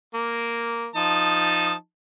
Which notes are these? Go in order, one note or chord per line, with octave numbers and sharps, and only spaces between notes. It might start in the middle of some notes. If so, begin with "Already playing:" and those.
A#3
F3 D#4 A5